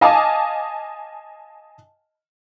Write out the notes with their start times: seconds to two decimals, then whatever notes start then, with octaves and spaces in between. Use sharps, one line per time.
0.01 D#5 F5 G#5 A5 D6 D#6